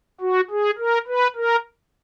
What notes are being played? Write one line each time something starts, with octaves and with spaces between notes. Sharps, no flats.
F#4
G#4
A#4
B4
A#4